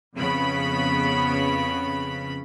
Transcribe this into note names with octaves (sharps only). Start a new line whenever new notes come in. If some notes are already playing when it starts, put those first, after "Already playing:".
F2 C#3 B3 B5